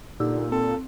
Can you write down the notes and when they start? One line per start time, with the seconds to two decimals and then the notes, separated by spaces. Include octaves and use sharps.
0.20 A#2 D3 D#4 G4 E6
0.52 C4 A4